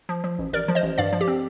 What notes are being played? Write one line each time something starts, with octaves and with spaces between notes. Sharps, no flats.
F3
F3
A1
A1 A#4 D5
F3
C5 D#5
A1
G2 D5 F5
F3
G4
C4